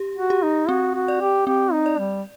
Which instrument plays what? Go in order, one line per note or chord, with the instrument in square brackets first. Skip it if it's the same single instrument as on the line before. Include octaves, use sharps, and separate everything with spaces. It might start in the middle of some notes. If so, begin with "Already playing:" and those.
Already playing: [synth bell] G4
[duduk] F#4
[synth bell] G4
[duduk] D#4
[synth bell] C4 [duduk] F#4
[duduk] F#4
[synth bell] D5
[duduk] G4
[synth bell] C4 [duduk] G4
[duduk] D#4
[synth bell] D5
[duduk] G3